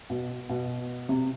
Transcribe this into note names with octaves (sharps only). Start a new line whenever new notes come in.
B2
B2
C3